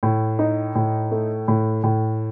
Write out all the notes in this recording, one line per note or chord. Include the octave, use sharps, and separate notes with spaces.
A2
D#4
A2
A3
A2
A2